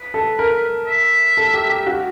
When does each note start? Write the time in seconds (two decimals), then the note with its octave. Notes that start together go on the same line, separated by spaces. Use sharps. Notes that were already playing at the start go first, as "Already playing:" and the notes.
Already playing: B4
0.14 A4
0.39 A#4
0.87 E5
1.37 A4
1.54 G4
1.70 G4
1.87 F#4